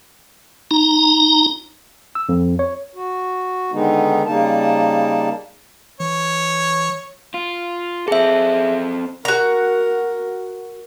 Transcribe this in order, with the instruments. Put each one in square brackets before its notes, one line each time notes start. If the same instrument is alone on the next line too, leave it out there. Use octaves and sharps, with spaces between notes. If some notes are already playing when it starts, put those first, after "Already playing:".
[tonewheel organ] D#4 A#5
[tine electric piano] E6
F2
C#5
[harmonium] F#4
D3 D#3 G#3 B3 D#4
C#3 G3 A#3 D#4 A5
[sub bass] E3 [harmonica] C#5
[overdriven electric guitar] F4
[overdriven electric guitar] C4 A4 [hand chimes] G#4 E5
[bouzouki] F#4 A#5 [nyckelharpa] A#4